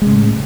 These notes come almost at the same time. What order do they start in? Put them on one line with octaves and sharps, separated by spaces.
G#3 C#3 A2